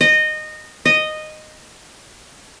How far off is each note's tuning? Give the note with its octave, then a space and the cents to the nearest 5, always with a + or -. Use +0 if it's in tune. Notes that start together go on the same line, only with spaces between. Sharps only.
D#5 -20
D#5 -10